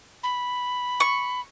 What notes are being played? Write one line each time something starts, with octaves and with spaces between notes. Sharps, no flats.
B5
C#6